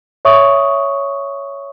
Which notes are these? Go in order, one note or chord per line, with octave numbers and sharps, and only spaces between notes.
C#5 E5 C#6 D#6